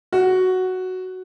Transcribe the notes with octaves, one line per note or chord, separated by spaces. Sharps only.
F#4